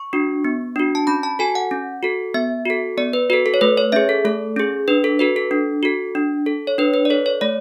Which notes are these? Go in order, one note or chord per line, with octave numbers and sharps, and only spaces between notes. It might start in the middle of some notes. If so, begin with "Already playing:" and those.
Already playing: C#6
D4 F#4
B3
D4 F#4
A5
C#4 B5
A5
F#4 A4 G#5
F#5
C#4
F#4 A4
B3 E5
F#4 A4
B3 D5
B4
F#4 A4 B4
A4
C#5
A3 B4
C#5
C#4 G#4 E5
A4
A3 A4
C#4 G#4
D4 B4
A4
F#4 A4 B4
A4
D4
F#4 A4
D4
A4
C#5
D4 B4
B4
D5
A4 C#5
C#5
A3 D5